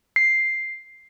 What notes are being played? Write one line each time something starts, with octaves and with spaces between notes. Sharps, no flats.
C7